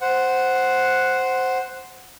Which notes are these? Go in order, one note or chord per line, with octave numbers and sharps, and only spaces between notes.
C5 F#5